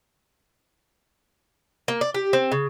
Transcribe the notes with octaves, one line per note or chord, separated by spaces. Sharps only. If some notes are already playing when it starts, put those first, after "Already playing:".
A#3
D5
G4
C4
C#3